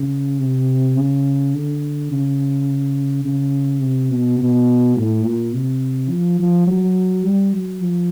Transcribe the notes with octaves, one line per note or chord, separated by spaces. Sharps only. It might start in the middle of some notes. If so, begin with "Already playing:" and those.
Already playing: C#3
C3
C#3
D3
C#3
C#3
C3
B2
B2
A2
A#2
C3
F3
F3
F#3
G3
F#3
F3